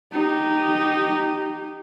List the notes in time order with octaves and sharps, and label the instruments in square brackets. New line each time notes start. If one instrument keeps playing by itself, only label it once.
[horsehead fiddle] D#4 G4